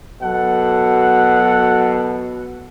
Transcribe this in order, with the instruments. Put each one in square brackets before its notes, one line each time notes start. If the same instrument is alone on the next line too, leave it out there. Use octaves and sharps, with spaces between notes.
[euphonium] B2 [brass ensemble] F#3 A4 [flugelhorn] F#5